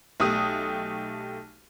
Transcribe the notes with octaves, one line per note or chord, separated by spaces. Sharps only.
B1 A3 G4 D#6 D#7